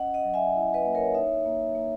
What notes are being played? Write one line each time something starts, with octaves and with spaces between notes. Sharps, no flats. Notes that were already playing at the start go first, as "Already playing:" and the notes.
Already playing: C#4 D#5 F#5
D#5 F#5
F#3
E5 G#5
E4
B4 D#5
A#3
A#4 C#5
D#4 C#5 E5
A#3
A#3